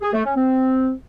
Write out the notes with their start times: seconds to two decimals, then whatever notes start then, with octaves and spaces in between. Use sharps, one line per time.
0.02 G#4
0.13 A3
0.24 C#4
0.36 C4